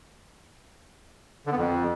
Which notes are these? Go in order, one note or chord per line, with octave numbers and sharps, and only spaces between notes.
D3
B3
F2